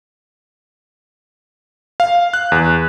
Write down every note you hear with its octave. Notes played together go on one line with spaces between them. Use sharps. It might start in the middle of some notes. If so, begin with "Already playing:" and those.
F5
F#6
E2